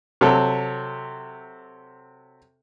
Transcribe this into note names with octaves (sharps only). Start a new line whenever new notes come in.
C3 F#3 A4